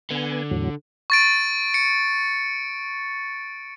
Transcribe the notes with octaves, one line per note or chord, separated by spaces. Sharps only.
D3 B3 G#5
E2 A2 F#3
C#6 A6 D7
C#7